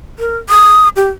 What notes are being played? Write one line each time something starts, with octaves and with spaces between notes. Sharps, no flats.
A#4
D#6
G4